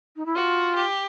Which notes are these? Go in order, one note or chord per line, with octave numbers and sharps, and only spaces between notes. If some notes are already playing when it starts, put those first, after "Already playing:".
D#4
E4
F4 F#4
G4